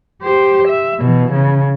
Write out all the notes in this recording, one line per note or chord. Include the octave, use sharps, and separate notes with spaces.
G4 C5
E5
B2 E3
C#3